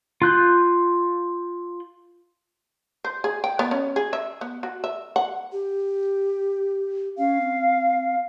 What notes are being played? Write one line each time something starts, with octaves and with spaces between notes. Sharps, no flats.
F4 F#6 G6
C5
G#4
G5
B3
C#4
G#4
E5
B3
F#4
E5
F#5
G4
C#4 F5
C4